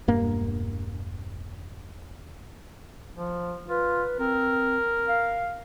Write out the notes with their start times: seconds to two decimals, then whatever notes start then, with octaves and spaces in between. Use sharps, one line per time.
0.08 E1 G2 A#3
3.16 F3
3.68 F4 B4
4.19 C4 A#4
5.08 F5